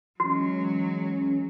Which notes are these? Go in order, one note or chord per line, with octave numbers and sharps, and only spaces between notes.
E3 F#3 G#3 C#4 F#4